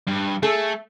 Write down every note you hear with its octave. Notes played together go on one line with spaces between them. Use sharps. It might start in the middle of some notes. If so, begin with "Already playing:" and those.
G2
A3 G#4 A4